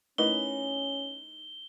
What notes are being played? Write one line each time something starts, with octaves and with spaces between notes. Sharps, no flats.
A3 C#4 D#4 E4 A#4 B4 G7